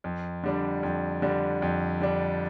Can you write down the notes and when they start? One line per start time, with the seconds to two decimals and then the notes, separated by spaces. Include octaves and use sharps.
0.04 F2
0.44 D3 G3 D4
0.83 F2
1.22 D3 G3 D4
1.62 F2
2.01 D3 G3 D4